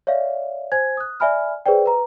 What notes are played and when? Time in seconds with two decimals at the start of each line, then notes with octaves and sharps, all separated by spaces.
0.07 C#5 D5 E5 F5
0.72 C5 G#5 G#6
0.97 D#6 F#6
1.20 D5 E5 G#5 B5 F6
1.66 G#4 B4 C5 D5 G5
1.86 B4 A#5